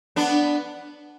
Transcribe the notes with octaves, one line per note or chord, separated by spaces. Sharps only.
B3 D4